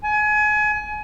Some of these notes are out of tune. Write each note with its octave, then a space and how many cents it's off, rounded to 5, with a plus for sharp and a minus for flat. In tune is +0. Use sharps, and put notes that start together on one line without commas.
G#5 +30